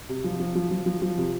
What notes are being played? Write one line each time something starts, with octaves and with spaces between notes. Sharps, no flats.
C3
F3
F3
F3
F3
F3
F3
C3